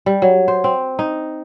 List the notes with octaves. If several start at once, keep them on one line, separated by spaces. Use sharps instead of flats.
G3
F#3
C5
C4
D#4